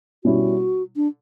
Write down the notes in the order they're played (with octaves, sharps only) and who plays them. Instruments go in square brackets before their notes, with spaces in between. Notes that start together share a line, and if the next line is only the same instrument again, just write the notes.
[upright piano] B2 G3 C#4 E4 [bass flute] F#4
[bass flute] D4